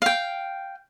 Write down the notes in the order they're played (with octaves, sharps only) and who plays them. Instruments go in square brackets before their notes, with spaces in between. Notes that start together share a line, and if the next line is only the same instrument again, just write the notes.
[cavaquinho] F5 G5